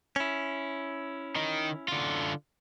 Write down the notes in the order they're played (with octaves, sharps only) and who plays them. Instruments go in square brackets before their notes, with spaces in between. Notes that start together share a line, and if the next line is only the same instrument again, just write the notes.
[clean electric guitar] C#4 E4
[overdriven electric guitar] D#3 D#4
D3 F4